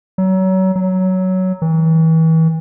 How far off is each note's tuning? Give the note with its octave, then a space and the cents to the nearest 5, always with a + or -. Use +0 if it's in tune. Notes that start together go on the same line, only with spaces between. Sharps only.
F#3 +30
F#3 +10
E3 -35